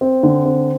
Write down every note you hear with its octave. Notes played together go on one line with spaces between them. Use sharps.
C4
D3
C4